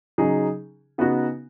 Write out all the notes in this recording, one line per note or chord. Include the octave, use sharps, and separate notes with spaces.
C#3 F#3 D#4 G#4
C#3 B3 D#4 F#4